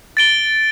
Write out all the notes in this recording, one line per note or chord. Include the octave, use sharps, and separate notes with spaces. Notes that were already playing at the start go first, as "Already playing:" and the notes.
A6 D7 G7